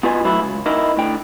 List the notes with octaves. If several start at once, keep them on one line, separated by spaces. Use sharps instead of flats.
B3 F4 F#4 B4 D#5 G#5
A2 F#3 E4 F#4
C#2
B3 D#4 E4 A#4 D#5
A2 D3 G5